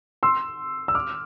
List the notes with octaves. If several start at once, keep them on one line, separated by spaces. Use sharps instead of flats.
C6 E6
E6
D6 F6